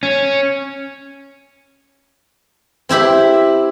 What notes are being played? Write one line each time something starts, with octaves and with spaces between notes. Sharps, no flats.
C#4
C4 E4 G4 B5